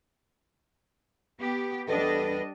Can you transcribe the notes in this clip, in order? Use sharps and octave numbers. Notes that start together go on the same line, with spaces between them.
B3 G4
E2 G3 D4 A4 B4 D#5